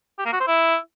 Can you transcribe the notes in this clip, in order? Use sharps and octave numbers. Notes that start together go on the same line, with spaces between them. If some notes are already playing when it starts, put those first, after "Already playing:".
G4
A#3
F#4
C5
E4